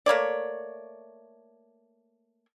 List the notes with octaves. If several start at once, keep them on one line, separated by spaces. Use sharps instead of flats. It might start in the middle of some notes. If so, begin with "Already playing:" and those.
A3 A#3 C#5 D5